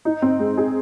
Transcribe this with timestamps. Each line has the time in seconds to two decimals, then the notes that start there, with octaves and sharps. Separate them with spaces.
0.05 D#4
0.22 C4
0.39 G#3
0.58 G#4